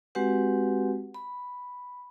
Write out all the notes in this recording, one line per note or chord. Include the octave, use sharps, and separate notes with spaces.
G#3 C4 F#4 G4 B4 F#5
B5